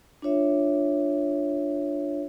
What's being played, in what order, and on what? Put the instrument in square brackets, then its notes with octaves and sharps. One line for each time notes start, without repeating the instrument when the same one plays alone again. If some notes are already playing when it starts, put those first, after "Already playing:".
[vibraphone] D4 F4 C#5 E5